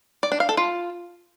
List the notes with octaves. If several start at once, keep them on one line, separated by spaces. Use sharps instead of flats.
D5
D4
F5
A4
F4